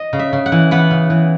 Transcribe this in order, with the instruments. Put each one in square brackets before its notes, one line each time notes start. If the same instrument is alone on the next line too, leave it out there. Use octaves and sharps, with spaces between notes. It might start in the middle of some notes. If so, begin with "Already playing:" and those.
Already playing: [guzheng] D#5
C#3
E5
C#3
F#5
E3
B3 F#5
C#3
E3